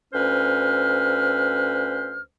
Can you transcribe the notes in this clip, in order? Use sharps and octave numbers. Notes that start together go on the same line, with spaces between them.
D2 C#4 B4 C5 F6